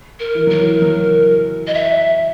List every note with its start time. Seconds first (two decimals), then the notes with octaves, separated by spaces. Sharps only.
0.20 A#4
0.35 E3
0.47 F#3 A#4
0.59 E3
0.82 F#3
1.67 D#5
1.74 E5